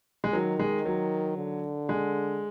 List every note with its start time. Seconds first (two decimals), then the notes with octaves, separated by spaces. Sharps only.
0.24 G#3
0.33 D#3 F#3
0.59 G#3
0.85 F#3
1.37 D3
1.89 G#3